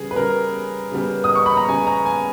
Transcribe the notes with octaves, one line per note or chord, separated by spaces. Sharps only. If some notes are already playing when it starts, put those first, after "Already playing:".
Already playing: C#3 G3 B3 G#4
B4
C#3 G3 B3 A#4
C#3 G3 B3
D#6
C#6
B5
A#5
C#3 G3 B3 G#5
A#5
G#5